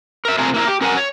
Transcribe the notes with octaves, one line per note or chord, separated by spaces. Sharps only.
A#4 E5
C3 A3 C4 F4 G#4 A#4
A#3 E4 A#4
G4
C#4 A#4 C#5 F#5 G#5
C#5